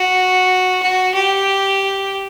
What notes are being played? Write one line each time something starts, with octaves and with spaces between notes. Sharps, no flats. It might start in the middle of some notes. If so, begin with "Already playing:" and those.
Already playing: F#4
F#4
G4